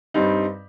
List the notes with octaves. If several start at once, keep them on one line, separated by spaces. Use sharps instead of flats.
G2 G3 C4 D#4